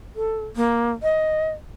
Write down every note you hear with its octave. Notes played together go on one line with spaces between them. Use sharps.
A4
A#3
D#5